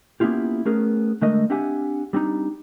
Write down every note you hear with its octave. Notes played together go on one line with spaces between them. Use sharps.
A#3 B3 C#4 E4 F4 G4
A3 B3 C#4 G#4 A#4
D3 G#3 A3 A#4 D#5
C4 D4 G4 E5 F#5 G#5
G3 C4 D4 D#4